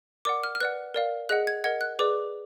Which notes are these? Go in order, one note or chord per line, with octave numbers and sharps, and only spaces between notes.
A#4 D5 F#5 D6
F6
F6
B4 D5 F#5 F#6
A#4 D5 F5
G#4 D#5 F#5 F#6
G#6
A#4 D#5 F#5 G#6
F#6
G#4 B4 D5 D6